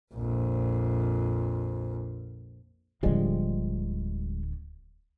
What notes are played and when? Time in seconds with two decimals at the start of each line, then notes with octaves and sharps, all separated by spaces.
0.14 A#1 F2
3.03 D1 D3 F3 G3 G#3